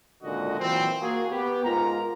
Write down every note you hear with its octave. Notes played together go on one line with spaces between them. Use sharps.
G#1 C#2 A#2 D3 F#4 D#5
A#2 E3 F#3 C4
A#3 F#4 G#4
B3 G4
G#2 F4 A#4 A#5